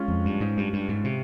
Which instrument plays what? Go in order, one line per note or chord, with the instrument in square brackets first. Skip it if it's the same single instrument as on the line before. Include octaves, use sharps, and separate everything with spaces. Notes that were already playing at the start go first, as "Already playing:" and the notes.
Already playing: [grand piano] G#3 C#4 F4
[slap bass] F2
G2
G#2
G2
G2
G#2
C3